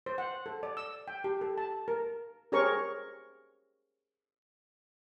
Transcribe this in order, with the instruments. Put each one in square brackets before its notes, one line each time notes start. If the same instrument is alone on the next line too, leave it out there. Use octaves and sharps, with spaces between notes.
[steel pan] C5
F#5
A4
D5
E6
G5
G4
A4
A5
A#4
G4 G#4 A#4 C5 C#5 C#6